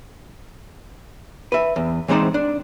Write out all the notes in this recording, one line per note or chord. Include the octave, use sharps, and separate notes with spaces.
B4 E5
E2
E3 G#3 C4 D#4 C5 D5
D4